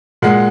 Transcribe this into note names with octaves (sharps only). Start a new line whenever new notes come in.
A#2 G#3 F#5